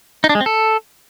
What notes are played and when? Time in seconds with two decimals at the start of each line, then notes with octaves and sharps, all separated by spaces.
0.24 D#4
0.29 D4
0.35 G#3
0.41 C4
0.46 A4